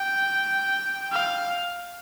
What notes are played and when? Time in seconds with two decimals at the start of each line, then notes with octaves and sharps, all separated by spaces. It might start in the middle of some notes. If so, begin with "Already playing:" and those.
Already playing: G5
1.13 F5